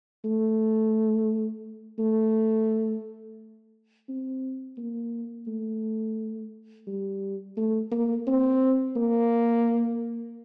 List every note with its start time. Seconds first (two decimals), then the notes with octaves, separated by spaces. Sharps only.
0.25 A3
1.99 A3
4.09 C4
4.78 A#3
5.47 A3
6.87 G3
7.57 A3
7.92 A#3
8.27 C4
8.96 A#3